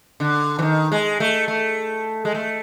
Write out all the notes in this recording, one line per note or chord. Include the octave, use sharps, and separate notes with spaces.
D3
E3
D#3
G#3
A3
A3
G#3
A3